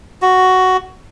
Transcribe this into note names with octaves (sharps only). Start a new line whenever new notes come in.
F#4